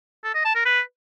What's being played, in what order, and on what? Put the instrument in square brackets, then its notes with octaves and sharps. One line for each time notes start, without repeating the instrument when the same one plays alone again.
[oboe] A4
D#5
A5
A#4
B4